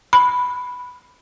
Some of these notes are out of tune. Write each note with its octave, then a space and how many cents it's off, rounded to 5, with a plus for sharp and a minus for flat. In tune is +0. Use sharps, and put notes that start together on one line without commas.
B5 +5